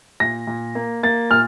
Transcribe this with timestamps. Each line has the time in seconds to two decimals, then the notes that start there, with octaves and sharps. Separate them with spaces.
0.20 A#2 A#6
0.47 A#2
0.75 A#3
1.03 A#3 A6
1.31 A#2 F6